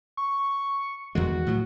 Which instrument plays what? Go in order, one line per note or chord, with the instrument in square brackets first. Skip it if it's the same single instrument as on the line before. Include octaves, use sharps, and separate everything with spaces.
[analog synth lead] C#6
[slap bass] E2 D#3 G#3 [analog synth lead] F#4
[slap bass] A2 F#3